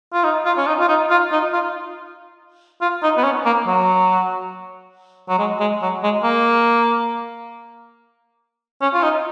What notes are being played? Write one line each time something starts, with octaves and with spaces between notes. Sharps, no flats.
F4
D#4
F4
C#4
D#4
F4
D#4
F4
D#4
F4
F4
D#4
B3
C#4
A#3
F#3
F#3
G#3
G#3
F#3
G#3
A#3
C#4
F4
D#4